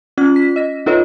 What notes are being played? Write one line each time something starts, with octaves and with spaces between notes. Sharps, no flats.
C#4 F4 F6 G#6
B6
D#5 A#6
D#4 F4 A4 B4 C#5 D#5